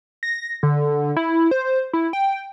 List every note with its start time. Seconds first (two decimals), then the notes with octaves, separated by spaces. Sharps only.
0.23 A#6
0.63 D3
1.16 E4
1.51 C5
1.93 E4
2.13 G5